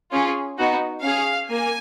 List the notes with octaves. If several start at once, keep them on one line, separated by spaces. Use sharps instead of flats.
C#4 F4 G#4
B3 D#4 F#4
C#4 G#4 F5
A#3 G#5